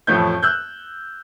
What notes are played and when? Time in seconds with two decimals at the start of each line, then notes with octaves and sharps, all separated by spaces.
0.07 A1 F2 F3 A3 C#5 G6
0.43 E6 F#6 G6